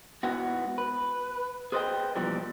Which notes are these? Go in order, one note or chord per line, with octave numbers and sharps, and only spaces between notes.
G#2 B3 E4 F#4
B4
G#4 B4 C5 D5 D#5 G5
B2 E3 F3 G3 A#3